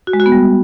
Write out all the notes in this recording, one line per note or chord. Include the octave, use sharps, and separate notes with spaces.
F#4
G#3
F#4
B3
G3